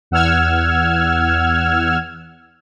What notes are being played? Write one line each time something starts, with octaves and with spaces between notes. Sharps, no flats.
E2 F#5 E6 F6 G#6